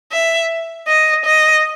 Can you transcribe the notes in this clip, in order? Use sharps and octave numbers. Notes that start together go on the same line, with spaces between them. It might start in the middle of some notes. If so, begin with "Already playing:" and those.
E5
D#5
D#5